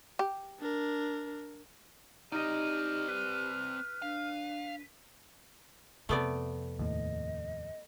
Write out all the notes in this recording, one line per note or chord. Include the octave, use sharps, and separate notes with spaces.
G4
D4 A#4
C4 D#4 G4 D5 D#5 F6
B4
D4 F5
F2 C3 A3 B3 D5
D#2 A2 D#5